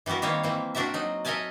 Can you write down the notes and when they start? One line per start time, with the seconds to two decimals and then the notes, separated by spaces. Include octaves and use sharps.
0.06 E3 G3 B3 F#4 A#4
0.22 D#3 G3 A#3 C4 C#5
0.43 E3 A#3 C4
0.75 C4 D4 F#4 A#4 D5 E5
0.94 F#3 D#4
1.25 A4 A#4 D#5 E5 G#5 A5